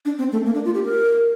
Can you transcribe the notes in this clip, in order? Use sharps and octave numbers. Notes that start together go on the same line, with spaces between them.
D4
C4
A3
A#3
D4
F4
G4
A#4